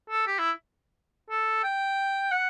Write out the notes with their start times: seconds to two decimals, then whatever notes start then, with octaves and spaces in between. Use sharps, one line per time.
0.10 A4
0.27 G4
0.39 E4
1.30 A4
1.64 G5
2.31 F#5